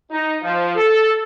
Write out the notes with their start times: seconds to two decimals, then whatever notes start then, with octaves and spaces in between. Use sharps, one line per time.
0.11 D#4
0.42 F3
0.76 A4